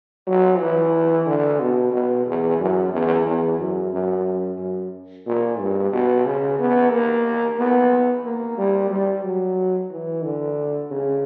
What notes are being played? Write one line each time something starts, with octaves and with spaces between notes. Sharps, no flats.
F#3
E3
D3
B2
B2
E2
F#2
E2
E2
F#2
F#2
F#2
A#2
G2
B2
C#3
B3
A#3
B3
A#3
G3
G3
F#3
E3
D3
C#3